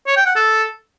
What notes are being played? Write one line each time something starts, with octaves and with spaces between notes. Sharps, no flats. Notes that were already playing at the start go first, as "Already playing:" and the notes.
C#5
G5
F#5
A4